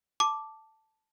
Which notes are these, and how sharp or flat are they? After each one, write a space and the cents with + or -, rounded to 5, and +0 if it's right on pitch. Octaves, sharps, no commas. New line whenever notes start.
A5 +0 D6 +0